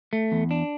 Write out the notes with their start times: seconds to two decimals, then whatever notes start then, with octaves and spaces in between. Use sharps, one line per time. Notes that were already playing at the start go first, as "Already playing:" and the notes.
0.13 A3
0.32 E2
0.51 D4